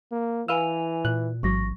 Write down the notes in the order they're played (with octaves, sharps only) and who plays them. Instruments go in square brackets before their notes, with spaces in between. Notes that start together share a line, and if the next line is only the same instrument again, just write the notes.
[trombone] A#3
[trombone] E3 [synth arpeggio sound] B4 F5 E6 [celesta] G#5 D#7 F7
[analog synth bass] A#2 [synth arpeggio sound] F#6
[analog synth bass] A1 [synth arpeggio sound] G#2 F#3 [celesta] C#6 A#6